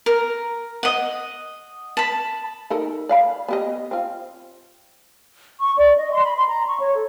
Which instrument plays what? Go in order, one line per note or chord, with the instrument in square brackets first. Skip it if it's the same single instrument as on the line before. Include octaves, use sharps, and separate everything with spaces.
[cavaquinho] A#4
D#5 F#5
A5 B5
[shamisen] D#4 A4 A#4
D5 F5 B5
B3 G4 D#5
C4 F4
[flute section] C#6
D5
D#5
C6
B5
C6
A#5
C#6
C#5
A4